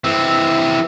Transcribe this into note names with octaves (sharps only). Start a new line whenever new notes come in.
E3 C4